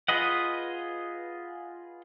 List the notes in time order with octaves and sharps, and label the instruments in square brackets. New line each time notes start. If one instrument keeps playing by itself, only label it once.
[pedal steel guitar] F4 G#4 B4 D#5 F#5